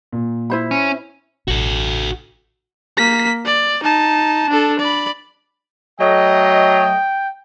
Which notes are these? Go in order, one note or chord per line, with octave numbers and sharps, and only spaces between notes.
A#2
E4 C5 B5
C#4
A1 B2 F#4 A4
A#3 B6
D5
D#4 A5
D4 A4
D5 B5
F#3 A3 D#5 G5